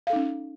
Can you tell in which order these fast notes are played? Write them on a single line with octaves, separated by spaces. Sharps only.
F5 A4 D#4 C#4